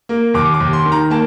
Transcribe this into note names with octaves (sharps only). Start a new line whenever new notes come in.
A#3
D#2 D6
D6
D#2
C6
D#3
A#5
A#3 A5